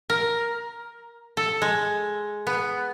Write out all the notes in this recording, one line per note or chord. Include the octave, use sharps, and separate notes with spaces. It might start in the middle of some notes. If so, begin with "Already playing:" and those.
A#4
A4
G#3
B3